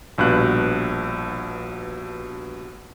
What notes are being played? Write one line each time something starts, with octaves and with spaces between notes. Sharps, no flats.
A#1 G2 B2 F#6